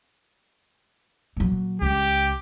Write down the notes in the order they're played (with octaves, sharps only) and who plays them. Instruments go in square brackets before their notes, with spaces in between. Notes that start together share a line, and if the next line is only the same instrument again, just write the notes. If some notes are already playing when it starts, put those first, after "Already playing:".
[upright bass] A#2 F#3
[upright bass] C#2 [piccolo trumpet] G4